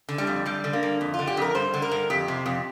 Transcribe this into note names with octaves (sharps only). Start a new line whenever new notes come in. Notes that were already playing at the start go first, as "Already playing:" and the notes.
D3
G3
F2
G2 G3
D3
A#3
G2
F2
F4
D3
G4
F2 A#4
G2 C5
D3
A#4
G2
F2 G4
C3
F2